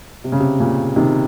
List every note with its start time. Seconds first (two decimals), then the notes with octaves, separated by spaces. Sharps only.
0.24 C3
0.32 C#3
0.40 C3
0.60 A#2 C#3
0.96 C3 D#3